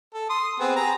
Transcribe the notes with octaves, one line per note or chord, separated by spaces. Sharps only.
A4
C6 D#6
B3 C4 G#4
G4 G#4 A#5